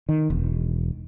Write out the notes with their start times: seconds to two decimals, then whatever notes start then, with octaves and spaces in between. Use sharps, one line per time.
0.09 D#3
0.30 E1